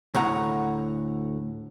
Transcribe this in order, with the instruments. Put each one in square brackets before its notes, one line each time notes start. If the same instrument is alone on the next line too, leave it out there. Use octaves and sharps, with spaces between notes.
[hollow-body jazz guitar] D2 A2 F#5 A#5